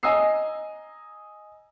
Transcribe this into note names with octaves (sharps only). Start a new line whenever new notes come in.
D#5 G#5 A#5 D#6 E6 C7